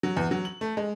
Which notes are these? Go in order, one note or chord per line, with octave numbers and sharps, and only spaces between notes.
F#3
E2
F#3
F#7
A3
G#3